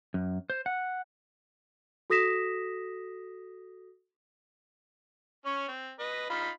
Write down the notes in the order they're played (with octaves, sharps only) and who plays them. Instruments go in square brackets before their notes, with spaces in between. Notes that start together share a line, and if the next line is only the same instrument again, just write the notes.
[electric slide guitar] F#2
C5
F#5
[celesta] F#4 A4 D#6 A#6 B6 E7
[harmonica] C#4 C#5
C4
B4 D#5
D#4 F4 B5